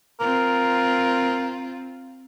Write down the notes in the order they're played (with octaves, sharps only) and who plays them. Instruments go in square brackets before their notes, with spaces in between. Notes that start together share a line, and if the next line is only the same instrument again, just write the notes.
[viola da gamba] C4 F4 [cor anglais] A#4